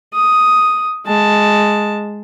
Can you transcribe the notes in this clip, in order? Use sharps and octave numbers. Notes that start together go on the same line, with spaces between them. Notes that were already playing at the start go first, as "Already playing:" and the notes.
D#6
G#3 A5